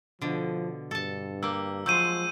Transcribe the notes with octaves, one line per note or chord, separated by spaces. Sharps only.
B2 D3 F3
G2 A4 A5
A#3 G4 E6
F3 F#3 G#3 C5 E6 G6 D#7